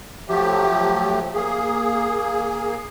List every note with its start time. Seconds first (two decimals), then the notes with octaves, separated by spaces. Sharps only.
0.29 F3 F#3 A3 G4
1.34 A#3 G#4